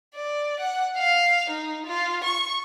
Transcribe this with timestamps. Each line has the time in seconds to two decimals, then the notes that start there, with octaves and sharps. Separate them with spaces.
0.15 D5
0.60 F#5
0.97 F5
1.50 D#4
1.86 F4
2.24 C#6